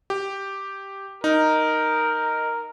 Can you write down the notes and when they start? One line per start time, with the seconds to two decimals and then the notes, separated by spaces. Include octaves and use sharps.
0.10 G4
1.24 D#4 A#4